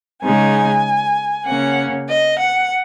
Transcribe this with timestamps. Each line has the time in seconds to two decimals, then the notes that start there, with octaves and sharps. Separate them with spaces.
0.23 C#3 G#3 D#4 G#5
1.46 C#3 A#3 C#4 F#5
2.08 D#5
2.39 F#5